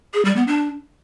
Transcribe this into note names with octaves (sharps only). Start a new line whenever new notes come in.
G#4
G3
B3
D4